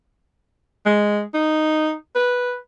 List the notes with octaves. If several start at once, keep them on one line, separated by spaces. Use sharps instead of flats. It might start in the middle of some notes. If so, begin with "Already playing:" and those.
G#3
D#4
B4